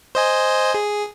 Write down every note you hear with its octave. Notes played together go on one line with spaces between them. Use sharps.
C5 D#5 G#5
G#4